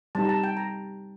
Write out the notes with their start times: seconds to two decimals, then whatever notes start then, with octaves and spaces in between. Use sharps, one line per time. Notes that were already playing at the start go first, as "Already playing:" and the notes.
0.15 G3 C4 D#4 G4 A5
0.25 A#5
0.29 A5
0.44 G5
0.57 A#5